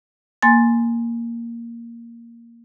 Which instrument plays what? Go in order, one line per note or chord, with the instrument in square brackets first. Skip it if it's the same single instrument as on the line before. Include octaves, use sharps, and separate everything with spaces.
[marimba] A#3 G#5 C6 A6